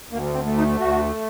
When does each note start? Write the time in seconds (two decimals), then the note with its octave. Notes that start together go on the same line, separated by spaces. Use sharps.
0.11 D2 A#3
0.34 C4
0.46 A3
0.57 D#4
0.80 D2 F#4